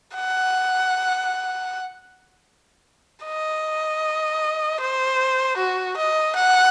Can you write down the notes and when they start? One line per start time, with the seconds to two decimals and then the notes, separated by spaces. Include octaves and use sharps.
0.16 F#5
3.25 D#5
4.81 C5
5.58 F#4
5.97 D#5
6.36 F#5